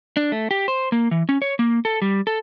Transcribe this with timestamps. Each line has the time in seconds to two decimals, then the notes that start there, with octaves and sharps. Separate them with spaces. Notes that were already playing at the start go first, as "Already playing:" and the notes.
0.17 D4
0.32 A3
0.51 G4
0.68 C5
0.92 A#3
1.11 E3
1.29 C#4
1.42 C#5
1.59 A#3
1.85 A4
2.02 G3
2.27 A4